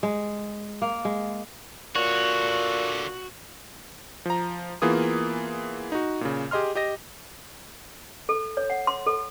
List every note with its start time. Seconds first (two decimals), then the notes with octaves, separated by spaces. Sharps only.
0.03 G#3
0.82 A#3
1.05 G#3
1.96 A#2 D3 F#4 C#5
4.26 F3 A#5
4.82 E3 A#3 B3 F4 G#4 D#6
5.92 D#4 F#4
6.21 A#2 C#3
6.51 G4 G#4 D#5 C6 F6
6.75 G4 D#5 A#6
8.29 A4
8.57 C#5
8.70 F#5
8.87 C6
9.06 A4